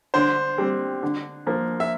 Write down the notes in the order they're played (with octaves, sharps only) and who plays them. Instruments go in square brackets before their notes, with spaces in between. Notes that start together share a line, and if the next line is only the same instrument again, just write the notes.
[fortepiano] D3 [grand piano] C5
[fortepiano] G3 C4
D3
F3 A#3
[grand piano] E5